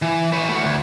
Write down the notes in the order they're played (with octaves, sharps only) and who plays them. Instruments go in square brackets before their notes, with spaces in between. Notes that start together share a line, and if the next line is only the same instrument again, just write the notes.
[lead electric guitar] E3
B4 C#5
A3 F#4
D2